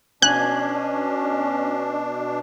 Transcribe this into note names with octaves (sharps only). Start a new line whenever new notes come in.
B2 C#4 D4 G#5 F#6